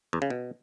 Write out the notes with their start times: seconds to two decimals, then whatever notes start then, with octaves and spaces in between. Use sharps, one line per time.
0.13 E2
0.22 C#3
0.30 B2